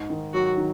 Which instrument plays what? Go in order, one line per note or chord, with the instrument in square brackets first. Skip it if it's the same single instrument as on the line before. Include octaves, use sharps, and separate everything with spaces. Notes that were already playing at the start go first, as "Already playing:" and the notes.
Already playing: [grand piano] G#2
D#3
[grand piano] F#3 [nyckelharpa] F#4
[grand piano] D#3